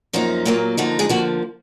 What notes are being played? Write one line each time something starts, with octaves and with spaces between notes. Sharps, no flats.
F#2 F3 A#3 D#4 F#4
A#2 F#3 A#3 F4
D3 F3 A#3 D#4 F#4
G#3 G#4
D3 F3 A#3 F#4